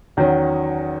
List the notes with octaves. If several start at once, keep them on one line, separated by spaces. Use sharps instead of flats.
E2 D#3 F#3 C#4 F#4